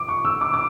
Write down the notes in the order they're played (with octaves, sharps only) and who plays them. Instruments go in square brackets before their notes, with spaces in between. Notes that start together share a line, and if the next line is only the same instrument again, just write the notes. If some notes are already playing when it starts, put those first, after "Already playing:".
Already playing: [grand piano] D6
C#6
E6
D6
D6